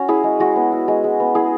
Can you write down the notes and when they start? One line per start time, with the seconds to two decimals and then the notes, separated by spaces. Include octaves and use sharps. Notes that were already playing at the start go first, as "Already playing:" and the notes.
Already playing: C#4 F#4
0.08 E4 G#4
0.24 G#3
0.40 G#3 F#4
0.56 B3
0.72 E4
0.88 G#3
1.04 G#3
1.20 B3
1.35 E4 G#4